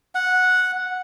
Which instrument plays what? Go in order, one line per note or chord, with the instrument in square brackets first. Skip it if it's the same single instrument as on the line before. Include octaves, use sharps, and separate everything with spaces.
[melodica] F#5